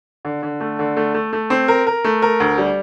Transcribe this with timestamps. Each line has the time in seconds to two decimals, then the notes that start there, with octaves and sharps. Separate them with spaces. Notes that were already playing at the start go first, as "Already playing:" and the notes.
0.25 D3
0.43 D3
0.60 A3
0.79 D3
0.97 A3
1.14 A3
1.33 A3
1.50 C4
1.68 A#4
1.87 A#4
2.04 A3
2.22 A#4
2.40 D2
2.58 G3